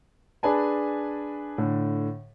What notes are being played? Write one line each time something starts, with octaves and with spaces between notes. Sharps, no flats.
D4 G#4 B4 G#5 A5
A2 D3